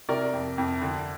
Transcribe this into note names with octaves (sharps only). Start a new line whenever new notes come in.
C3 A#4 D5
F2
F2
D3